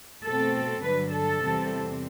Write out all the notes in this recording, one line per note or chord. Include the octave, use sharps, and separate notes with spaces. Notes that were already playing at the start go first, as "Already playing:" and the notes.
B2 A3 C4 A4
G2 D3 F#3 B4
A4
E2 C3 E3 G3 C4